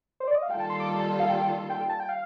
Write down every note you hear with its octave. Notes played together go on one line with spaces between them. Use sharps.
C5
D5
D#5
F5
D#3 G3 A#3 F4 A4 G5
A5
C6
D6
A5
F5
G5
G5
A5
G5
F5